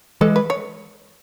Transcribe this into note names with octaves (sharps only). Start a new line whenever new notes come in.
E3 G#3 A4
B4
C#5